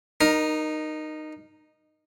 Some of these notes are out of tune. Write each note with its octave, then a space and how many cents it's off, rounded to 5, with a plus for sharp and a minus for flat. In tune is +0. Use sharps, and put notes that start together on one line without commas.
D#4 -15 A#4 +10